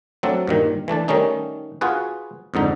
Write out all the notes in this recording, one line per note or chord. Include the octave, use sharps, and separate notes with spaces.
F#3 A3 C4 D4 A4
G2 A#2 D#3
E3 A3 D4 A5
D#3 G3 A3 C#4 D#4
F4 F#4 G#4 B4
F2 G#2 D3 D#4